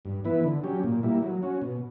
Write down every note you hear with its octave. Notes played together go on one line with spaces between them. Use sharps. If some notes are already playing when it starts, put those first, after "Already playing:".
G2
E3 B3 E4 B4
D3
F#3 C#4 G4
A#2
G3 A#3 E4
F#3
C#4 F#4
B2